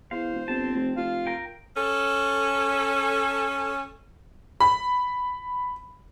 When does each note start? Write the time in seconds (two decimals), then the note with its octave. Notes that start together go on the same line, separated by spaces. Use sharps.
0.11 E2 C5 F5
0.34 E1
0.48 G1 C4 A5
0.74 F1
0.96 F1 F4 F5
1.27 A#4 G5
1.75 C#4 A4
4.60 B5